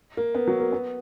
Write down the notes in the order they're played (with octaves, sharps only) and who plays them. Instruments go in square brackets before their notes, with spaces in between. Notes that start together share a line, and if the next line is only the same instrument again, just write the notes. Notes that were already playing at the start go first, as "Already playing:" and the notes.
[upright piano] A#3
B3
F#3
A#3
B3